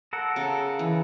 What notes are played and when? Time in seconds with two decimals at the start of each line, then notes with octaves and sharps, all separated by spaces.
0.13 A4 A#4 F#5
0.36 C#3
0.79 E3